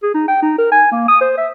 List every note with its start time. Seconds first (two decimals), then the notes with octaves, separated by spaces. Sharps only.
0.03 G#4
0.14 D#4
0.28 G5
0.42 D#4
0.58 A#4
0.71 G#5
0.92 A#3
1.08 D#6
1.21 C5
1.37 E5